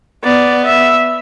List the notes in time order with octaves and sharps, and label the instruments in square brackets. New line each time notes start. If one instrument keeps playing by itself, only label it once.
[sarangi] B3 [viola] D5
[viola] E5